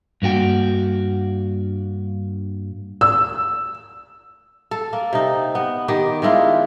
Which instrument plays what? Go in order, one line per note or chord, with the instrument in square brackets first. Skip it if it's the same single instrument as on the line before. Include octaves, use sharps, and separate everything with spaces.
[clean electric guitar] G2 A#3 F#4 G5
[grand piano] E6
[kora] A4
A#3
C3 D#4
B3
D#3 G4
D#3 G#3 E4 F4